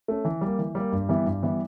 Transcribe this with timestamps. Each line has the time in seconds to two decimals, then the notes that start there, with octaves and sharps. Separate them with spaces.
0.08 A3 C#4
0.25 E3
0.41 G3 A#3
0.59 E3
0.75 G3 A#3
0.92 G2
1.09 E3 G3 B3 E4
1.26 G2
1.43 E3 G3 B3 E4